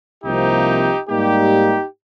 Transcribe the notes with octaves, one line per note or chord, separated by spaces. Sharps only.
C2 C3 F3 A#3 D#4 G4
G#2 G3 A#3 D#4 G4